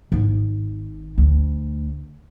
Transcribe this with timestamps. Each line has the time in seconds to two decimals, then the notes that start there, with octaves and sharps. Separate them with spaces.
0.12 G#1
1.18 D2